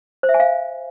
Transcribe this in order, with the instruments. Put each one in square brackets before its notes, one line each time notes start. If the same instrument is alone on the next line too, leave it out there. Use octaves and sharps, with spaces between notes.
[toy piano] C5
E5
G#5
F5